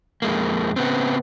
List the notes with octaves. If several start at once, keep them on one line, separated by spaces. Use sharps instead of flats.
F2 G#3 A#3
C#3 B3 C4